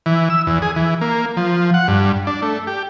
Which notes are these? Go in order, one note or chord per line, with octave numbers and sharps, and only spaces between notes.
E3
E6
E2
G#4
E3
A#3
F3
F#5
G2
D4
A3
G4